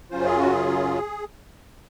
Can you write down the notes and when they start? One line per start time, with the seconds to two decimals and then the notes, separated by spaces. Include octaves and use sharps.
0.11 F#2 C#3 F#3 C#4 F4 C5
0.25 G#4
0.39 F#4
0.52 G#4